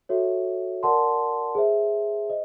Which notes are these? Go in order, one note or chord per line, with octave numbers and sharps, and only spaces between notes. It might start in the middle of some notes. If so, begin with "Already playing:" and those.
F#4 A4 C#5 E5
A#4 D5 F#5 A5 C6
G#4 C5 E5
C5 D#5